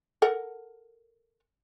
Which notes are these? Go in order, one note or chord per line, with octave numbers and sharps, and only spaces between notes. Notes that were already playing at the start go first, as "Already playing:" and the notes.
A4 A#4 F#5